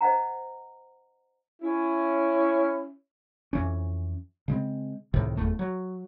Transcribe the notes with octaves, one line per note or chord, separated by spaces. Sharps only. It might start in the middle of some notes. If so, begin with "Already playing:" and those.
C5 D#5 F#5 A#5
C#4 E4
F2 E3 C#4
C#3 G#3 C4
C#2 A2 C3 D#3
F#1 E2 A3
F#3